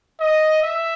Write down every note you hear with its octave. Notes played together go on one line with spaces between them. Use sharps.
D#5
E5